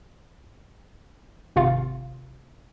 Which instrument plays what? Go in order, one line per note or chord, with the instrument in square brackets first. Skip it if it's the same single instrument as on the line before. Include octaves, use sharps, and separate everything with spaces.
[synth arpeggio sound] G#1 C3 F4 F5